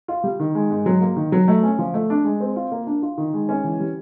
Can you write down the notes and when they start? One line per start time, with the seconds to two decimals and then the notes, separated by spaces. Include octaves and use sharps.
0.08 F4
0.24 G3
0.40 D#3
0.55 G#3
0.70 G#2
0.86 F#3
1.01 A#3
1.16 D#3
1.32 F#3
1.48 A3
1.63 C#4
1.79 F3
1.94 A3
2.10 D4
2.24 G#3
2.41 C4
2.56 F4
2.72 A#3
2.87 D4
3.02 F4
3.18 D#3
3.34 G#3
3.49 C#4
3.64 E3
3.80 G3